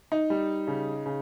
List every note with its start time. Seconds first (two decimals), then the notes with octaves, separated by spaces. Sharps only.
0.12 D#4
0.30 G3
0.67 C#3
1.06 C#3